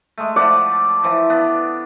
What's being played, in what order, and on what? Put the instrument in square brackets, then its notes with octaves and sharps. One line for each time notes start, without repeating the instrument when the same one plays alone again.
[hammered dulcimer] G#3 A3
[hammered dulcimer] F3 A3 F#5 [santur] D5
[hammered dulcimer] E3 F3
B3 D4